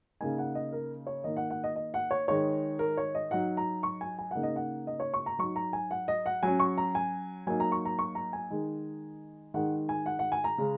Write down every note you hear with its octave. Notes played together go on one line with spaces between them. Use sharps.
C#3 A#3 D#4 G#5
F#5
D#5
A#4
C#5
D#3 A#3 D#4 D#5
F#5
F#5
D#5
D#5
F#5
C#5
D#3 G#3 D#4 C#5
A#4
C#5
D#5
F#3 D#4 F#5
A#5
C#6
G#5
G#5
C#3 A#3 D#4 F#5
D#5
F#5
D#5
C#5
C#6
A#5
F#3 D#4 C#6
A#5
G#5
F#5
D#5
F#5
F#3 C#4 G#5
C#6
A#5
G#5
F#3 A#3 D#4 G#5
A#5
C#6
A#5
C#6
A#5
G#5
D#3 G#3 D#4
D#3 G#3 D#4 F#5
G#5
F#5
F#5
G#5
A#5
C#3 G#3 C#4